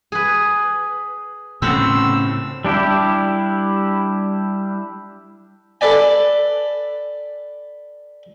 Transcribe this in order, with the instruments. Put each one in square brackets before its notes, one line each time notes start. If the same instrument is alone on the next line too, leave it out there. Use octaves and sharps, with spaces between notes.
[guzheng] G#4 B4
[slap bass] A2 C#3 [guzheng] C4 F#5 [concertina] E6
[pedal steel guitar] G3 D4 E4 G4
[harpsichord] A4 B4 D5 G#5